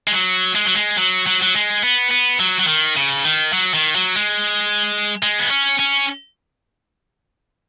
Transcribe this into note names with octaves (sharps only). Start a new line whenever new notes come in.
G#3
F#3
G#3
F#3
G#3
F#3
F#3
F#3
G#3
B3
B3
F#3
F#3
D#3
C#3
D#3
F#3
D#3
F#3
G#3
G#3
B3
C#4
C#4